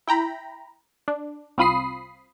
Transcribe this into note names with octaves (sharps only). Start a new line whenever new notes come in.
E4 G5 A#5 B5
D4
C2 C4 F4 B5 D#6 C7